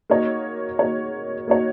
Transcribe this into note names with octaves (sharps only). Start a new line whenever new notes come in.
A#3 D#4 F#4 C#5
A#3 D#4 F#4 C#5
A#3 D#4 F#4 C#5